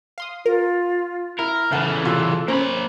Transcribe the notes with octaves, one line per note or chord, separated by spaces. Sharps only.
F5 C6 D#6
F4 A#4
E4 A#4
C#3 E3 A4 E5 F#5 A5 G6
C3 F4 F#6
A#3 C#4 A#4 C5 B5